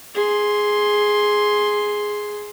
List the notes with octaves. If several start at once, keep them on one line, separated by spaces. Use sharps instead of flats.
G#4 C6